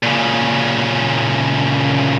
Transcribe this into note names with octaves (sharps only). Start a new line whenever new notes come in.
A#2 C#3